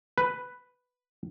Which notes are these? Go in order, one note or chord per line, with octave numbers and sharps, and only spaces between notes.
B4